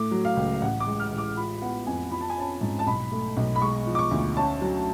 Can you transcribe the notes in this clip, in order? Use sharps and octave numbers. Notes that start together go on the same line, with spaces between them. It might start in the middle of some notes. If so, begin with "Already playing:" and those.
Already playing: A2 A3 D6
F#3
F5
C#2
F5
A1 F#5
D6
G#3
F6
A1
D6
F4 B5
B3 F#5
F2 G#5
F4 B5
A5
G#5
C#4 A5
G#2
A5
B1 B5
A3
B1
B5
G#3 C#6
F3
D6
C#6
D2
C#4 A5
F#3